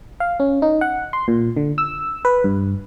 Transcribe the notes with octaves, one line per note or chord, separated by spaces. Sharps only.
F5
C#4
D#4
F#5
C6
A#2
D3
E6
B4
G2